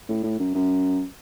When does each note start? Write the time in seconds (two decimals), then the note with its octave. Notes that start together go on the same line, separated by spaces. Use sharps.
0.09 A2
0.23 A2
0.39 F#2
0.54 F#2